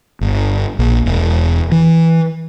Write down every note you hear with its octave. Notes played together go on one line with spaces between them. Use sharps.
G1
A#1
E1
E3